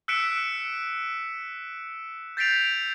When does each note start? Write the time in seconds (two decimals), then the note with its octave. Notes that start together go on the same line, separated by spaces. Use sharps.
0.08 E6 F#6 B6 C#7 D7 E7
2.37 G6 A6 B6 C7 D7 F7